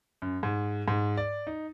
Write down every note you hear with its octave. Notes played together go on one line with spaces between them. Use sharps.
F#2
G#2
G#2
D5
D#4